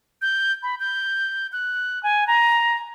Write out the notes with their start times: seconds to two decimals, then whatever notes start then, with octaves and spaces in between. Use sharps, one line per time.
0.22 G6
0.63 B5
0.80 G6
1.53 F#6
2.03 G#5
2.27 A#5